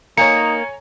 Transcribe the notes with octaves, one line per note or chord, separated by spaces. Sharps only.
A#3 D#4 C#5 G#5 A#5 C#7